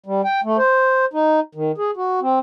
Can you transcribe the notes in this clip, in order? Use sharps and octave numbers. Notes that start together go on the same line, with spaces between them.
G3
G5
A3
C5
D#4
D#3
G#4
F#4
C4